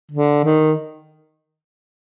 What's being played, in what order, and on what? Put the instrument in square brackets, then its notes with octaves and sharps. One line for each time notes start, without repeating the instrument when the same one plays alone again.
[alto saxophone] D3
D#3